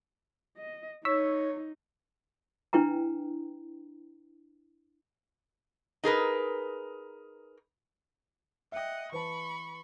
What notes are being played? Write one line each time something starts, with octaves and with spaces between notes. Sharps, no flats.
D#5
D#4 C#5 C#6 E6 B6
D4 E4 B4 G5 A#5
D#4 G#4 A#4 B4
D#5 E5 F#5 G5
E3 B4 A5 B5 C#6